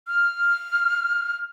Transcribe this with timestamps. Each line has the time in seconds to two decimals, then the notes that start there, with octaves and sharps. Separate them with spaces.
0.08 F6